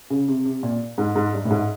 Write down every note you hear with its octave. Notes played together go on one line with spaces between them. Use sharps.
C#3
C3
C3
A#2
G#2
G#2
G2
A2
G#2